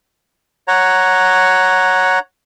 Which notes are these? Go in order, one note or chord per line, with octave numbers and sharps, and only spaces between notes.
C#5 F#5 A#5